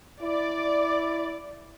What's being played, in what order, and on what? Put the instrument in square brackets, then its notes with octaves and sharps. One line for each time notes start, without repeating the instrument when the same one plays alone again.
[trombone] E4 [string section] D5